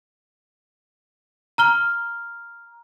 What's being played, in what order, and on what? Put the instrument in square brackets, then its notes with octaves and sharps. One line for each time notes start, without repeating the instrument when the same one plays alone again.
[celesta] A#5 F6 G7